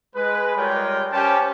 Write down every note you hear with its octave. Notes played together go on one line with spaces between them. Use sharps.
G#3 B4
G3 G#3 F4 A#4 C#5 G5
C#4 G4 B4 C5 G5 A5